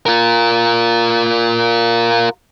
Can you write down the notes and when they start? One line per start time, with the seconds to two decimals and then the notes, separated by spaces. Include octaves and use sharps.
0.06 F4 A#4